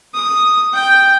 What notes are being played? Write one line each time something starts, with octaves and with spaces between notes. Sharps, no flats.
D#6
G5